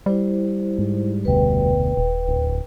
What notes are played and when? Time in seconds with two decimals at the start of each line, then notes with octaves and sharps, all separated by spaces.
0.06 G3 E4 C5
0.78 G#2
1.25 F1 D2 B2 B4 G5
1.97 D#1
2.28 D1